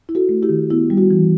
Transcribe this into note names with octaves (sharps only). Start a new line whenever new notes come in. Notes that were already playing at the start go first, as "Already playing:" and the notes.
E4
F#4 A4
A3
E4 G4
D#3
B3 E4
G3
F#4
E3